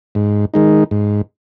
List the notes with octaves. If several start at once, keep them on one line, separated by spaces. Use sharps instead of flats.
G#2
D#3 G#3 D#4
G#2